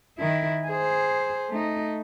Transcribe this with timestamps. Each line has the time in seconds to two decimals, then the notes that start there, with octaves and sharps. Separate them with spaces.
0.18 D#3 E4
0.67 G#4 C5
1.49 A3 D#4